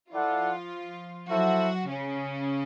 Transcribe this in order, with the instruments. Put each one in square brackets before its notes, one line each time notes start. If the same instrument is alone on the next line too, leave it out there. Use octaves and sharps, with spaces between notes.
[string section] F3 F4 [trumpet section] E4 A4 D5 F#5
[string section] F#3 F#4 [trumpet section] E4 A4 C5 E5
[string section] C#3 C#4